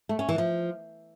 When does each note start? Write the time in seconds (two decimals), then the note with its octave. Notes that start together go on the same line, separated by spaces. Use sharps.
0.09 A3
0.19 C#4
0.29 E3
0.38 F3